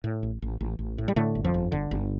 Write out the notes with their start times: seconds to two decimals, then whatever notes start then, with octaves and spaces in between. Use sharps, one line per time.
0.04 A2
0.23 A1
0.42 A1
0.61 A1
0.79 A1
0.98 A2
1.08 G3
1.16 A2 D3 A3
1.35 G1
1.44 F2 F3
1.54 G1
1.72 G1 D3
1.91 G1